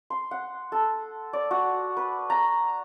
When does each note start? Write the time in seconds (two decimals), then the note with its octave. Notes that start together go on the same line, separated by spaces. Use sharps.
0.10 C6
0.31 F#5
0.72 A4
1.33 D5
1.51 F#4
1.97 B4
2.30 A#5